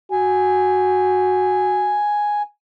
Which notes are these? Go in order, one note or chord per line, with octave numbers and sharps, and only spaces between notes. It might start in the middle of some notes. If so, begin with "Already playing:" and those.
F#4 G#5